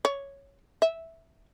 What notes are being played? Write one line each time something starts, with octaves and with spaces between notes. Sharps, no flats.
C#5
E5